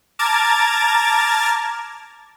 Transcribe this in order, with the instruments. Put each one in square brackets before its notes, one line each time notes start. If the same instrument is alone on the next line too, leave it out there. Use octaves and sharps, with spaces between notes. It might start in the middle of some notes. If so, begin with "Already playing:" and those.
[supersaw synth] A5 A#5 D6 F6 G#6 A6